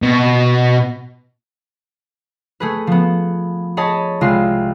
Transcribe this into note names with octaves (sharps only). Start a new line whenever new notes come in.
B2
A3 G#4 B4
F3 B3
G#4 C#5 D#5 G#5 A5 B5
C2 G#3 F4 C6